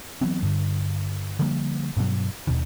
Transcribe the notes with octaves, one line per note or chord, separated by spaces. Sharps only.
E3 F#3 B3 C4
G2 D3
D3 F3 G3 A#3
G2 B2 F#3
D#1 D#2 B2 D#3